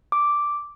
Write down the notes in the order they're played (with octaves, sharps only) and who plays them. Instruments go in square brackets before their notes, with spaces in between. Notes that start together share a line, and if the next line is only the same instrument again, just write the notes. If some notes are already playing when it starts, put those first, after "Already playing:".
[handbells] D6